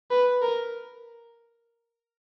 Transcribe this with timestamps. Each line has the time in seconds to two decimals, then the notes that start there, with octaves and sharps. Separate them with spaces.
0.11 B4
0.42 A#4